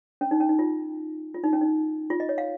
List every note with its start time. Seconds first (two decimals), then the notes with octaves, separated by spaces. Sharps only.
0.21 C#4
0.31 D#4
0.40 C#4
0.49 D#4
0.59 F4
1.34 F4
1.44 D#4
1.53 C#4
1.61 D#4
2.10 F4
2.20 D#5
2.29 C#5
2.38 F5